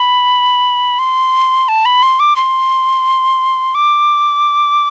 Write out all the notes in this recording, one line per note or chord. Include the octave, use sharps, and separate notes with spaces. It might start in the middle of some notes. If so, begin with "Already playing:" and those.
Already playing: B5
C6
A5
B5
C6
D6
C6
D6